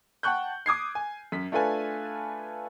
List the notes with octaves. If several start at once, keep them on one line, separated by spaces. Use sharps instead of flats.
F#5 G5 A5 C#6 F#6 G6
D6 D#6 G#6 C7
G#5
F#2 B6
A3 D4 F4 A4 B4 G#5